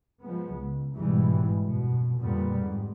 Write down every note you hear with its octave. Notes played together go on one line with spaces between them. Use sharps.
F3 G#3 B3
C#2
G#1 G2 B2 E3 G3 G#3
F#2 B2
F2 A#2 D3 G3 B3
G#2